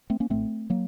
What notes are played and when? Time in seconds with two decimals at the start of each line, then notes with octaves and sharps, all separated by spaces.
0.10 A3 C4
0.20 A#3 C#4
0.30 A1 A2 A3 C4
0.70 F#3 A#3